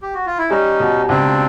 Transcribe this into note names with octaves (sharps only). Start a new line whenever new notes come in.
G4
F#4
F4
E4
G3 C#4 D#4
B2
C#2 C4 D4